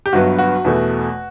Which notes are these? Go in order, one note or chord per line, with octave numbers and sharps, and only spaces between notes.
G4
G1 G2 F#3 B3 F#4
F#4
E2 B2 A3